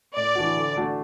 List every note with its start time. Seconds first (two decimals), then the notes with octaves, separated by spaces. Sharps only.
0.16 A2 D5
0.35 E3 D4 F#4
0.57 D3
0.76 A3 D4 F#4